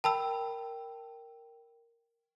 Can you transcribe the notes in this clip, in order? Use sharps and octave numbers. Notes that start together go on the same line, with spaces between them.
A#4 G5 A5 B5 E6